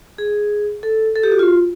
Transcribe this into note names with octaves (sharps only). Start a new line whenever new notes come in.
G#4
A4
A4
G4
F#4
F4